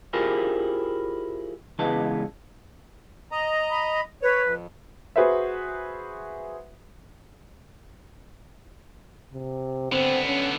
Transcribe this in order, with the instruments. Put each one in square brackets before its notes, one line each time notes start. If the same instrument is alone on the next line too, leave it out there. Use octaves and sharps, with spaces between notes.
[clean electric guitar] E4 F4 G4 G#4 A#4 C5
C#2 E3 G#3 B3 A5
[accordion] D#5 A#5
[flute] B5
[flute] B4 [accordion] C#5
[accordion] F2
[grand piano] F#4 G#4 B4 C5 E5
[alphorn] C3
[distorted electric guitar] D3 B3 [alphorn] C4
[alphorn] C#4